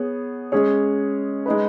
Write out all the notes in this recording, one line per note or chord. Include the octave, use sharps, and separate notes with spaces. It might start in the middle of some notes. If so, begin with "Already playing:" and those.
Already playing: B3 G#4 C#5
G#3 C#4 G#4 C#5
G#3 D#4 B4